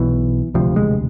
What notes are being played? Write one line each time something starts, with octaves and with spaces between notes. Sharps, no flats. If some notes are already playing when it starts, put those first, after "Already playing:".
Already playing: B1 B2 E3
E1 D2 C3 F3
G#3